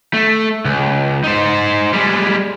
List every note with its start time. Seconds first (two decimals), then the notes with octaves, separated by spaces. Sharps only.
0.13 A3
0.65 C#2
1.24 D#4 C5
1.93 G3 G#3